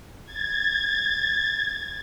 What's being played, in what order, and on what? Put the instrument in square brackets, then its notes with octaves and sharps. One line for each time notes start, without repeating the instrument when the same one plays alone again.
[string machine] G#6 A6